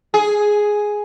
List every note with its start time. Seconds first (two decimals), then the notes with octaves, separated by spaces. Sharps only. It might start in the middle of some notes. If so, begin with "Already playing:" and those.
0.14 G#4